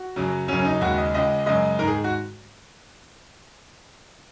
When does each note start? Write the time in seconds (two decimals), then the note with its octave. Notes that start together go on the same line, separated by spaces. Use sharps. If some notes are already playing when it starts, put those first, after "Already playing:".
Already playing: F#4
0.16 F#2 C#3 F#3
0.48 F#2 C#3 F#3 C#4
0.59 C#4
0.65 D#4
0.81 D#2 C#3 G#3 F#4
0.98 D#5
1.14 C#2 C#3 G#3 D#5
1.46 F#2 C#3 G#3 D#5
1.79 G#2 D#3 G#3 A#4
1.87 G#4
2.04 F#4